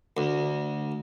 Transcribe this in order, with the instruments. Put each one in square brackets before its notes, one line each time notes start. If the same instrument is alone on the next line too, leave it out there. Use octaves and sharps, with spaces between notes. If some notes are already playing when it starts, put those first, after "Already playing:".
[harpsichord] D2